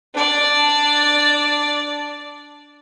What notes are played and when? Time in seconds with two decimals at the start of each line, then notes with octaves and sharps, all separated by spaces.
0.15 D4 D5